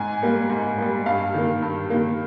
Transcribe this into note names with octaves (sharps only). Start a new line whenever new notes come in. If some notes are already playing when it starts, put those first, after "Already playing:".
Already playing: G#2 G#5
G3 A#3
G#2
G3 A#3
G2 F5
D#3 A#3
G2
D#3 A#3